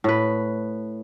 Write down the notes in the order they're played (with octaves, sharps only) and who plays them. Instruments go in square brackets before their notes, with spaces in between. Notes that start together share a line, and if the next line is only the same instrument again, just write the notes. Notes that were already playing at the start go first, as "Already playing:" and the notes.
[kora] A2 B4